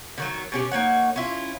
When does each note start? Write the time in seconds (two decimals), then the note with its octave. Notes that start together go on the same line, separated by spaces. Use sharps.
0.18 D3 D#3 F#3
0.52 B2 C#4 G4
0.72 A#3 D#4 C#5 F#5
1.16 C#4 E4 F4